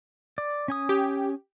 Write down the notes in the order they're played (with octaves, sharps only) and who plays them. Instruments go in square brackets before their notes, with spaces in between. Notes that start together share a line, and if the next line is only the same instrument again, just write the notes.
[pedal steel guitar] D5
C#4 G#5 D#6
[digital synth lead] G4